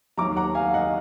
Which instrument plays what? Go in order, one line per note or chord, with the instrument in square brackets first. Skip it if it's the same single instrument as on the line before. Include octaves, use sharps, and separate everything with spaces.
[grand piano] D#2 D#3 F#3 A#5 D6
F#5 A#5
F5 G#5
D#5 F#5